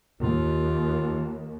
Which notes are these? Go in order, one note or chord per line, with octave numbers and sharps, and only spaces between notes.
D#2 F4